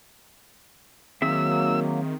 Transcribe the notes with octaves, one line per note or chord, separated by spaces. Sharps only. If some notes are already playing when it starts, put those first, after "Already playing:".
D#3 F#3 A#3 C4 G#4 E5 E6